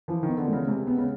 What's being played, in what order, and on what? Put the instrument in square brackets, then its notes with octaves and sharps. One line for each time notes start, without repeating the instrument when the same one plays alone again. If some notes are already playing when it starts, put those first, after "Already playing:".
[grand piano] E3 [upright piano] F3
[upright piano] D#3 [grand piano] B3
[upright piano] D3
[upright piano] C#3 [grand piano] G#3
[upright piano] C3 [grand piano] G#3
[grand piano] B3
[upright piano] C#3